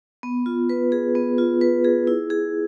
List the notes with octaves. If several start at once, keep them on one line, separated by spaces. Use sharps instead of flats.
B3
F4
B4
G#4
B3
F4
B4
G#4
E4
G#4